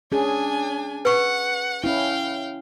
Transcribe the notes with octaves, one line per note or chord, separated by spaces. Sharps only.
C#4 D4 G#4 G#5
B4 F#5 C#6
C#4 E4 F5 G5